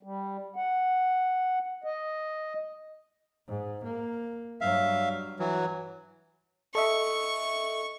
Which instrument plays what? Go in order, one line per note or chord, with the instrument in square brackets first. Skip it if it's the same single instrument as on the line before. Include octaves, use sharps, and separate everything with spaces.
[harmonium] G3
F#5
D#5
[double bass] G#2
A#3
[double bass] G2 F#3 [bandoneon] E5 F5
[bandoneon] E3 F#3
[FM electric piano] A4 D#5 E5 [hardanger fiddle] C#6